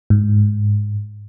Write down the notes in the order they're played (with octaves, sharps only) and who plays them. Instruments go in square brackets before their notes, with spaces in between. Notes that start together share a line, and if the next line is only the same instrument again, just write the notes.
[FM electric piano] G#2